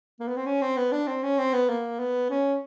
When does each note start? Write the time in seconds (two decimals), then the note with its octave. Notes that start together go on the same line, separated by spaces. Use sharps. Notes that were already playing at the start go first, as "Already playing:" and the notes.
0.20 A#3
0.28 B3
0.37 C4
0.46 C#4
0.62 C4
0.77 B3
0.92 D4
1.08 C4
1.23 C#4
1.38 C4
1.53 B3
1.69 A#3
1.99 B3
2.30 C#4